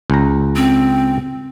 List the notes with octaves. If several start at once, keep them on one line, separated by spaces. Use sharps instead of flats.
C#2 A#5
C4